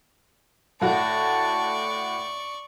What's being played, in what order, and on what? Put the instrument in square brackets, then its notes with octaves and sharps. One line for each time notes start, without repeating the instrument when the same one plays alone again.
[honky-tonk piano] A2 F#4 [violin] D5 C#6 [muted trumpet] A5